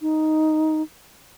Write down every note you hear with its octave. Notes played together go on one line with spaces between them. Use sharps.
D#4